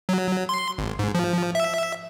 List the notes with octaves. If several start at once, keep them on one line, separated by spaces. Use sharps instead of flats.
F#3
C6
G#1
G#2
F3
E5